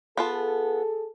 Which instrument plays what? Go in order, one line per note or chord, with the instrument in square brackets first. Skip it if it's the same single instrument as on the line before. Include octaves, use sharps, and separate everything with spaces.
[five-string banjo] B3 F4 A5 [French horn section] G#4 A4